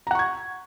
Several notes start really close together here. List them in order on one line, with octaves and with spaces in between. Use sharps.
A#5 F#5 C#6 G#6